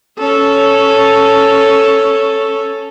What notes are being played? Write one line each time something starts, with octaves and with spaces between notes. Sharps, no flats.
C#4 A4